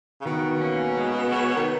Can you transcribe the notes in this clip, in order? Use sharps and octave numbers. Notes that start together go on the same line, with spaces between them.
C#3
B2 D#3
A#3 C#4
G#3
B3 F#4 C#5
D#3